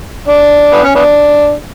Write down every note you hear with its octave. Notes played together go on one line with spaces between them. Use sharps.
D4
B3
C#4
B3 D4